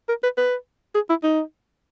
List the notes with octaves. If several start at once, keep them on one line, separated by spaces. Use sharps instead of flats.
A#4
B4
B4
G#4
E4
D#4